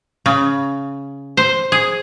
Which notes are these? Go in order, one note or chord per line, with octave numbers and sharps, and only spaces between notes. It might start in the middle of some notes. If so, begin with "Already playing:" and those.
C#3
C5
G#4